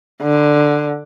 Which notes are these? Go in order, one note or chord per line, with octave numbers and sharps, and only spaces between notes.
D3